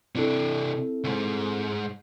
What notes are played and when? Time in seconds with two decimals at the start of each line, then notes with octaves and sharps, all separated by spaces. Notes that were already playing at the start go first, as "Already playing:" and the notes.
0.15 C3 C4 D4 E4 A4
1.04 C#2 G#2